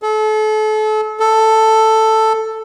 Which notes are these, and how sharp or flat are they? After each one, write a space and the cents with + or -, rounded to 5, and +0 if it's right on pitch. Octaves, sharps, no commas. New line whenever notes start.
A4 -35
A4 +5